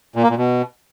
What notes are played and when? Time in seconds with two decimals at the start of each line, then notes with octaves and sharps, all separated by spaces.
0.16 A#2
0.23 A#3
0.30 A#2
0.37 B2